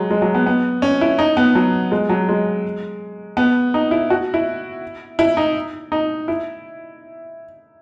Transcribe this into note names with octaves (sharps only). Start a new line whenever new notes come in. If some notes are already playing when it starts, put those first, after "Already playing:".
Already playing: F#3 G#3
G#3
F#3
B3
B3
C#4
E4
D#4
B3
F#3
G#3
F#3
G#3
B3
D#4
E4
F#4
E4
E4
D#4
D#4
E4